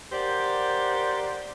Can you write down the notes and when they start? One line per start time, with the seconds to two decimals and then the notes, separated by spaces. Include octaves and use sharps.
0.12 G4 A#4 C5 D5 F#5